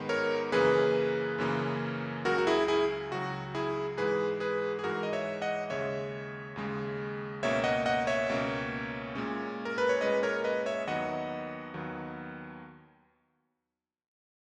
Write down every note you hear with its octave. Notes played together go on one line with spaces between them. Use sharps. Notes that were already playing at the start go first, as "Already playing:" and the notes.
Already playing: G#2 D#3 G#3 B3
A#4 C#5
F#2 C#3 E3 A#3 C#4 G#4 B4
F#2 C#3 E3 A#3 C#4
C#2 C#3 F#3 F#4 A#4
F#4
E4 G#4
E4 G#4
C#2 C#3 F#3 F#4
E4 G#4
G#2 E3 G#3 G#4 B4
G#4 B4
G#4
G#2 E3 G#3 F#4 A#4
D#5
C#5 E5
D#5 F#5
D#2 C#3 G#3 C#5 E5
D#2 C#3 G#3
C#2 B2 A#3 C#4 C#5 E5
D#5 F#5
D#5 F#5
C#5 E5
C#2 B2 A#3 C#4
A#2 G#3 C#4
A#4
B4
C#5
A#2 G#3 C#4 B4 D#5
A#4 C#5
B4 D#5
C#5 E5
D#2 D#3 F#3 B3 D#5 F#5
D#2 D#3 F#3 B3